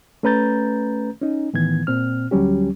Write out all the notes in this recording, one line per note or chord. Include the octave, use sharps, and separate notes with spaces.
A3 C#4 B4 A#5 G6 A6
C#4 D#4
A2 D#3 E3 B3 G#6
A#2 C4 F6
D2 F#3 G3 C#4 G4